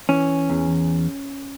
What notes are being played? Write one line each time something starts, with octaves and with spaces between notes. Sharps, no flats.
E3 C#4
E2